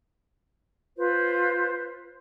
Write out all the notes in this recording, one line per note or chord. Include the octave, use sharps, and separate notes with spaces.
F4 B4 C5